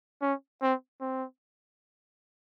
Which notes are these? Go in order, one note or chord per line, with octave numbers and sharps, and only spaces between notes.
C#4
C4
C4